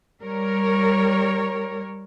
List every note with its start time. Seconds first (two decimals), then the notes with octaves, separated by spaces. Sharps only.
0.22 G3 A#4 C#5